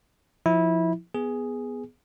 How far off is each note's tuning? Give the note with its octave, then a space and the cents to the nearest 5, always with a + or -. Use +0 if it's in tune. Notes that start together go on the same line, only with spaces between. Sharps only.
F3 +0 E4 -20
B3 +0 G#4 +0